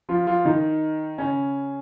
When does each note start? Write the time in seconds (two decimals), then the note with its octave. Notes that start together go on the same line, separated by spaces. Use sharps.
0.09 F3 F4
0.27 F3 F4
0.45 D#3 D#4
1.18 C#3 C#4